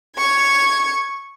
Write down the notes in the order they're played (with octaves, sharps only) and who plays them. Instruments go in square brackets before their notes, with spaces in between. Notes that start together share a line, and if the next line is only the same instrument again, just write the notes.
[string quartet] C#6 G#6